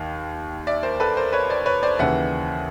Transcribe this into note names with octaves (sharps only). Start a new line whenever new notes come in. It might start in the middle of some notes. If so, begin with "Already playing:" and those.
Already playing: D#2 D#3 F5
D5 E5
A#4 C5
A4 B4
A#4 C5
B4 C#5
C5 D5
B4 C#5
C5 D5
D#2 C#3 E3 E5 F#5